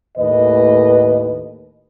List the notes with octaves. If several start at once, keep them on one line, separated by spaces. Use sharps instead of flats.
D#2 A2 B4 D#5